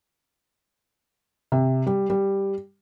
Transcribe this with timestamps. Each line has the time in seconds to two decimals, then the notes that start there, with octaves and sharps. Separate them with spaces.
1.52 C3
1.86 G3
2.10 G3